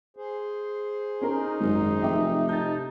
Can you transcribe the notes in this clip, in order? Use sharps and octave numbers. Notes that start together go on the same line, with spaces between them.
G#4 C5
C#4 D#4 A#4 A#5
G#1 F#2 G#3
F1 E5 G5 D6
C3 D#4 A5 G6 A6